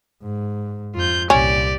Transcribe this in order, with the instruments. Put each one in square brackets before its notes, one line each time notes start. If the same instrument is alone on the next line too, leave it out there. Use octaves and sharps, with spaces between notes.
[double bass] G#2
[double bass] F2 [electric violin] F4 G6
[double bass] C2 A#2 [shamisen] C#4 [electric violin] G4 D5